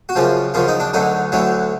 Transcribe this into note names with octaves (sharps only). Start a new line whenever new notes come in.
F#4
F#2 C#3 F3 F4
F#2 C#3 F3 F4
D#4
D4
D2 D3 F#3 D#4
D2 D3 F#3 E4